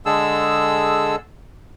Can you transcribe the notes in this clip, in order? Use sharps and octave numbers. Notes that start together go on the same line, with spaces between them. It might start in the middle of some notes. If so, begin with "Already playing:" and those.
D3 G#3 G#4 A4 E6